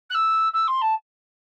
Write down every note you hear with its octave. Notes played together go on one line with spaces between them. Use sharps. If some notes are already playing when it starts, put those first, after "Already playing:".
F#6
E6
E6
C6
A5